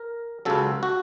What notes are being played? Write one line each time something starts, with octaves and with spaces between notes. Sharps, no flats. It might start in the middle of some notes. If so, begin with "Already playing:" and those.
Already playing: A#4
C#2 C#3 F#3 A4
F#4